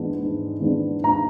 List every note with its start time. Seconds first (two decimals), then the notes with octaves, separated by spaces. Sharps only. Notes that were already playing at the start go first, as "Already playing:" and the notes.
Already playing: G#2 E3 G#3 B3 D4
0.18 G#2
0.60 E3 G#3 B3 D4
1.04 G#2 A#5